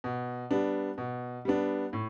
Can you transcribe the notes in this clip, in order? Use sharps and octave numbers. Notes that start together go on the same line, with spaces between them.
B2
G3 B3 D4
B2
G3 B3 D4
A2